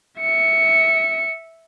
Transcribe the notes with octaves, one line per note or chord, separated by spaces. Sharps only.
E5 C#7